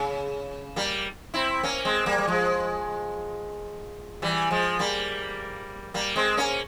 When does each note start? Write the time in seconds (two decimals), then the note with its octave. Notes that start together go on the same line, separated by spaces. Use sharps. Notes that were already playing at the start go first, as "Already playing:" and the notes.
Already playing: C#3
0.76 G3 A#3
1.34 C4 E4
1.63 A#3 C#4
1.85 G#3 C4
2.06 G3 A#3
2.18 G3
2.27 F3 G#3
4.22 E3 G3
4.51 F3 G#3
4.79 G3 A#3
5.94 G3 A#3
6.16 G#3 C4
6.37 A#3 C#4